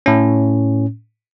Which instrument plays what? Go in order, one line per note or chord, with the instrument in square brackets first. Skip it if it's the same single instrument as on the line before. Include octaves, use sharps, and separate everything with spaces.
[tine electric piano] A2 C#4